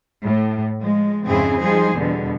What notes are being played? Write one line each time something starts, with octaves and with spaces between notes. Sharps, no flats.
A2
F3 G#3
F2 G#2 C#3 C4 E4 G#4
F3 G3 D#4 G#4 C5
E2 B2 D3 G3